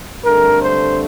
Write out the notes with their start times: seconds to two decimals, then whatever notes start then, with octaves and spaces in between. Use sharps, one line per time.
0.24 G2 D3 A3 C4 A#4
0.61 C5